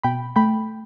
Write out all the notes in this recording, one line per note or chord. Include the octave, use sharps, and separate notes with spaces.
B2 G5 B5
A3 G5 B5